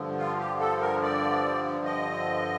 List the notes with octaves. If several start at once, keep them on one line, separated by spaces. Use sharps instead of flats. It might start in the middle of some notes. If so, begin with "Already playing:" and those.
Already playing: G2 D3 F3
F4
G4
A4
A#4
D5
D#5